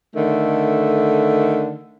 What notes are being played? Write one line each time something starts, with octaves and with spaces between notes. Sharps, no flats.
D3 D#3 A3